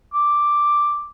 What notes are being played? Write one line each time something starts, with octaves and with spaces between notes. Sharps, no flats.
D6